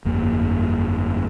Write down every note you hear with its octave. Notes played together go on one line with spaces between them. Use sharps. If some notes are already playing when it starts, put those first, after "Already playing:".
G1 F2 A#3